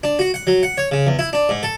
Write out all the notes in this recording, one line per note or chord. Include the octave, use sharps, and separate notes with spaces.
D4
F#4
F#5
F#3
F#5
C#5
C#3
E2
E4
D4
G#2
A4